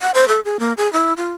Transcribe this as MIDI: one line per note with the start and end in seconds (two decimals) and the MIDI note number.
0.01 0.11 78
0.14 0.27 72
0.28 0.40 69
0.45 0.57 68
0.59 0.73 58
0.77 0.91 68
0.93 1.13 64
1.17 1.34 65